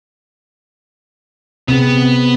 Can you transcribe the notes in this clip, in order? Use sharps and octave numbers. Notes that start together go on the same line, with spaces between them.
C3 B3 C4 G#4